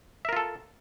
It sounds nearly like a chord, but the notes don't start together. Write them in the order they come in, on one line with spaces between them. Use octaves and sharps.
E5 A#4 F4 A4